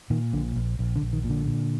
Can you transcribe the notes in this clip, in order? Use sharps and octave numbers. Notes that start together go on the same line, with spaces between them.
A#2 D#3
A#1 D3
A#1
A#1
D3
A#1
D#3
A#2
D3
A#2